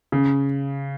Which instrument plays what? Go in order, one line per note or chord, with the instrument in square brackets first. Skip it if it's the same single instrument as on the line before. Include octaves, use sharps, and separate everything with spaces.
[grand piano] C#3